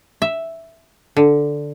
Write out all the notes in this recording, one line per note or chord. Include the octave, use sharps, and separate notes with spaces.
E5
D3